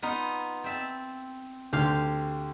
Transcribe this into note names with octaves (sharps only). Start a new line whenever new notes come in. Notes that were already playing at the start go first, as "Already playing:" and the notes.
B3 D#4 F4
C4 E5 A5
D2 G4 F5 C6